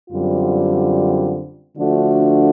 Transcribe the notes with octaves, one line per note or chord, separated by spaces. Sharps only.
F#2 D3 G3 C4 F4
D3 F3 A3 D4 F#4